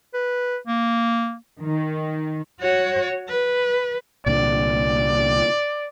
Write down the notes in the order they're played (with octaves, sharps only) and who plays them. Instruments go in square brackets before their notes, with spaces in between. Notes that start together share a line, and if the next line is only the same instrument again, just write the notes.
[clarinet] B4
A#3
[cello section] D#3
[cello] F#4 C#5
B4
[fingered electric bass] C2 A#2 D3 [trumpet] D5